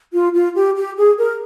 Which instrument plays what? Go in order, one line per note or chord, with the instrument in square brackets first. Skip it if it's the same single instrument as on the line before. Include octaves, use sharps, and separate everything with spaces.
[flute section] F4
F4
G4
G4
G#4
A#4